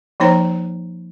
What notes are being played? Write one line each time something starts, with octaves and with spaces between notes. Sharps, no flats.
F3 A#3 D#4 C5 C#5 A#5